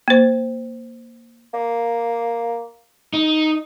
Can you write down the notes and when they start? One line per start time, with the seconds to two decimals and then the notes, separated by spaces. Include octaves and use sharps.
0.08 A#3 C5
1.54 A#3
3.13 D#4